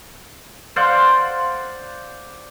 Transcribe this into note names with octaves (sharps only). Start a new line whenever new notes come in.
C5 D5 F5 F#5